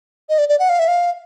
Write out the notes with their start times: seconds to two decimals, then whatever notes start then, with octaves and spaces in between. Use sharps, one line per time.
0.29 D#5
0.38 D5
0.49 D5
0.59 F#5
0.69 F5
0.79 E5
0.88 F5